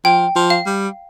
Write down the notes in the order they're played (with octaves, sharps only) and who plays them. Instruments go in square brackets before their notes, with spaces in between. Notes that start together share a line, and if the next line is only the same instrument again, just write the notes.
[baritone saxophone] F3 [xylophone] G5
[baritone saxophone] F3
[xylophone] F5
[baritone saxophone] G3